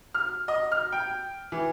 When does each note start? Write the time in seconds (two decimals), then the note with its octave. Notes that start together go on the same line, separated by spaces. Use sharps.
0.15 F6
0.48 D#5
0.72 F6
0.92 G5
1.52 E3